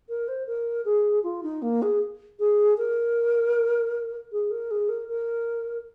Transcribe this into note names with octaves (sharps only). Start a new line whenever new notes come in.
A#4
C5
A#4
G#4
F4
D#4
A#3
G#4
G#4
A#4
G#4
A#4
G#4
A#4
A#4